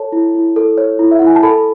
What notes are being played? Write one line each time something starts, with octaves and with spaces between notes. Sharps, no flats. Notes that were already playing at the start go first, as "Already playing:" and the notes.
Already playing: A4 C#5 A5
E4
E4
A4
C#5
E4
E5
E4 F#5
G#5
A5
A4 B5